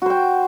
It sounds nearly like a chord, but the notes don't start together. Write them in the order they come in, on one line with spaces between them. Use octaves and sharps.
F#4 C5 G5